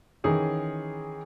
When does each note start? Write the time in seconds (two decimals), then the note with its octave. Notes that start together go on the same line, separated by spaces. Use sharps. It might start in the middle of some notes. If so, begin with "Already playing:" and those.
0.24 D#3 E3 C#4 G#4 C#5